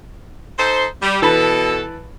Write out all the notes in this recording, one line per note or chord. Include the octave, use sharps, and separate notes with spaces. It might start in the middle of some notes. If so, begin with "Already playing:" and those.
D#4 A4 C5
G3
B2 E3 A4 A5 B5